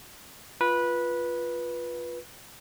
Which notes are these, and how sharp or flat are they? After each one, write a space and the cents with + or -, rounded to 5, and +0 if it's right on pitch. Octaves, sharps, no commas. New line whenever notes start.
F4 +0 B4 -15